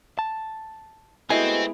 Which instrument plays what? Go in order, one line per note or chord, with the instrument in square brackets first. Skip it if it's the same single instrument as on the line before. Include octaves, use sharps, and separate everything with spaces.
[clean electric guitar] A5
[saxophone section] G#3 A3 B3 [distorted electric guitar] C4 [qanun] E4 [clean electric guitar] F#4 D#5 G#5